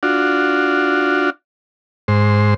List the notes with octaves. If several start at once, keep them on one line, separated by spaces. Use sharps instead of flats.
D4 F4 F#4
G#2 C5